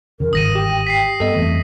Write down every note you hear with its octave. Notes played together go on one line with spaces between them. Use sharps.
E2 C#3 A#4
G1 G#2 D#3 D#6 A#6 D#7
G4 G5
G5 B6 C7
G2 B3 A4 D#5
F2 E3 A3